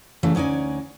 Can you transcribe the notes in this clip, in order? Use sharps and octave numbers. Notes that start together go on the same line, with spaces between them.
C#3 E3 G3 A3
D2 C#4 D#4 D5 G#5